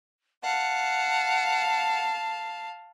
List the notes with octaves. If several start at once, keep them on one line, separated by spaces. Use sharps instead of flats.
F5 F#5 A5